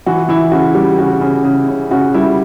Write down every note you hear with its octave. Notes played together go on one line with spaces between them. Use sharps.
E3 F#4
E3 E4
C#3 F#4
G3 G4
C#3 F#4
C#3
C#3
C#3
C#3 F#4
G3 E4